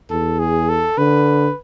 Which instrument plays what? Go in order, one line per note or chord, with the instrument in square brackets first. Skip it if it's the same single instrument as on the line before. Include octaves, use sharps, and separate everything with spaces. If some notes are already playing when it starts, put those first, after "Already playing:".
[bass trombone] E2 [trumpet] A4
[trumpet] G#4
A4
[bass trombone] D3 [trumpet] B4